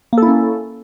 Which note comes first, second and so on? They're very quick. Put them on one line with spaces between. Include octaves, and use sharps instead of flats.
A#3 A4 E4 C#4